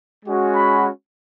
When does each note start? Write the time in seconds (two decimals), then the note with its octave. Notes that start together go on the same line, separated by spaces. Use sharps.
0.24 G#3 C#4 F#4
0.54 B5